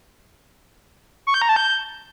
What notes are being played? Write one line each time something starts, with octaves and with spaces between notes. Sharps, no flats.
C#6
G6
A#5
A5
G6